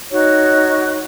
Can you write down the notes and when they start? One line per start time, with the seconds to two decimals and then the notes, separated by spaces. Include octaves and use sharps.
0.10 D#4 F#4 C#5